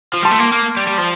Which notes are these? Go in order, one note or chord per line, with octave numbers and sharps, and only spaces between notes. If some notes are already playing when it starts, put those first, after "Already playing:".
F3
G3 A5 C6
A3
A#3
A#3
G3
G3
F3